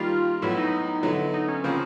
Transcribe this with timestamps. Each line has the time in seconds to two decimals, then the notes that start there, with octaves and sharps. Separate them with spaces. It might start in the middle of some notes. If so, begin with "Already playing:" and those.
Already playing: D#3 G3 A#3 F4
0.42 A2 F#3 B3 E4
0.57 D#4
1.03 D3 F#3 B3 E4
1.34 D#4
1.48 C#4
1.64 C#3 F3 A#3 C4 C#4